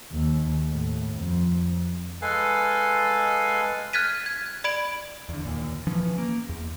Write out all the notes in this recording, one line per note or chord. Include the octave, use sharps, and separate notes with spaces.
D#2
A2
F2
G#3 A4 B4 F5 G#5
F6 F#6 G#6 A6 B6 D#7
G#6
D5 B5 G#6 D7 F#7
E2 D3
D#2 A#2
E3 F3 C#4
A#3
E2